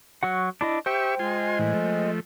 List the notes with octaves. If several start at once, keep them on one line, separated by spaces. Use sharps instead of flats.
F#3 F#4 F#5
D4 E4 D#5
G4 C5 E5 G5 C#6
G#3 F4 G#5 C6
A2 E3
F3 A3